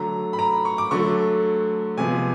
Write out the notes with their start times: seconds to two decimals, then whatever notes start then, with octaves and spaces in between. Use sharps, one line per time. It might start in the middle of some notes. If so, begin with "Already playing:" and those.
Already playing: D3 F#3 A3 A#5
0.33 B5
0.39 A#5
0.65 C#6
0.78 D6
0.91 D3 F#3 A3 C#6
1.97 C3 F3 G#3 B3 G#5